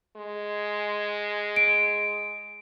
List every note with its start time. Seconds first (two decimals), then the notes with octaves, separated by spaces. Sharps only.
0.17 G#3
1.56 D7